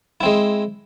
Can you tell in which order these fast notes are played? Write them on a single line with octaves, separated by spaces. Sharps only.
E4 C4 G#3